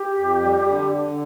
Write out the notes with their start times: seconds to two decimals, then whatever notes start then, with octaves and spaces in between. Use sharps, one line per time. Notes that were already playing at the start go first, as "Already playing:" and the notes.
Already playing: G4
0.18 F2
0.42 G3
0.67 D3
0.92 D3